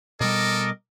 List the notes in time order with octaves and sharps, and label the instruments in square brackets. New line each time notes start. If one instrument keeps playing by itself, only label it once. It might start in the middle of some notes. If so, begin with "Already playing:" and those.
[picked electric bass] B2 G3 [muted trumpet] A4 [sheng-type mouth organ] A#4 D#5 D6